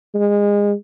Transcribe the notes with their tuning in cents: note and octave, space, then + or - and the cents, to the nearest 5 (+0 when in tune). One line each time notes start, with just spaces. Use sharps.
G#3 -25